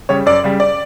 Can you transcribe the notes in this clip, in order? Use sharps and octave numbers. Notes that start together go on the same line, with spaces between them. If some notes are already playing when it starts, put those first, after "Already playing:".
C#3 G3 C#5
F#2 D5
C#3 G3
D5